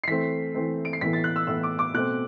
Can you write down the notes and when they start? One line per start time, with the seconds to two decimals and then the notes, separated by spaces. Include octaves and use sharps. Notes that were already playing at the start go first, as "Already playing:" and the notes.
0.04 C7
0.08 E3 A3 C4 B6
0.55 E3 A3 C4
0.85 D7
0.93 C7
1.01 A2 E3 B3 B6
1.13 A6
1.24 F#6
1.36 E6
1.47 A2 E3 B3 E6
1.63 D6
1.79 D6
1.94 B2 A3 C4 F#6